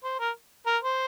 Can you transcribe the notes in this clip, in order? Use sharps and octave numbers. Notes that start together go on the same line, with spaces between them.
C5
A#4
A#4
C5